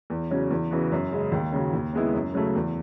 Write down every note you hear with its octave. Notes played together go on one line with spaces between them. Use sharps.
E2
C#3 F#3 C#4
E2
C#3 E3 B3 F#4
F#2
C#3 G#3
D#2
C#3 F#3
D#2
C#3 G#3 B3 E4
F#2
C#3 F#3 A3
E2